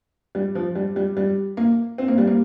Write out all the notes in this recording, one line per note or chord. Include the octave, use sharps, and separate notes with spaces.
G3
F3
G3
G3
G3
A#3
C4
A#3
G3
A#3